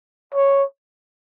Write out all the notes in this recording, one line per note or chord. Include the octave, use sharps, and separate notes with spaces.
C#5